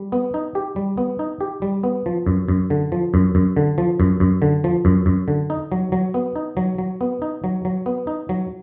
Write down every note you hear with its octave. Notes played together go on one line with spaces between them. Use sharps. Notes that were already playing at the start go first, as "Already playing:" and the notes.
Already playing: G3
B3
D#4
G4
G3
B3
D#4
G4
G3
B3
F3
F#2
F#2
D3
F3
F#2
F#2
D3
F3
F#2
F#2
D3
F3
F#2
F#2
D3
D#4
F#3
F#3
B3
D#4
F#3
F#3
B3
D#4
F#3
F#3
B3
D#4
F#3